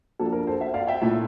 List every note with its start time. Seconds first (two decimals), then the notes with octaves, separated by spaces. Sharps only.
0.19 F3 A#3 D4 A4
0.32 A#4
0.47 A4 C5
0.60 C5 E5
0.74 D5 F5
0.87 E5 G5
1.02 A#2 A3 E4